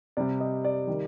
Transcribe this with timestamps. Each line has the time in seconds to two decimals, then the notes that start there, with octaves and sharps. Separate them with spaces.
0.17 C3 G3 D5
0.41 D#5
0.65 D5
0.87 D#3 G3